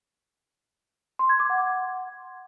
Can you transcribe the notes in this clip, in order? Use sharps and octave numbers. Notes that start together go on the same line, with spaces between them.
C6
G#6
D6
F#5